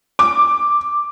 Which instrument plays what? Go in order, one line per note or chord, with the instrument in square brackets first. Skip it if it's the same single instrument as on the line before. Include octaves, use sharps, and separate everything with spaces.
[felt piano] D6